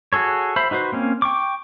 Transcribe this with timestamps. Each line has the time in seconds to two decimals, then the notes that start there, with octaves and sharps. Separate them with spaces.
0.13 F#4 G#4 A4 C#5
0.56 C5 E5 B5
0.71 D#4 F#4 B4 C5
0.92 A#3 C4 C#4
1.22 G5 C#6 D6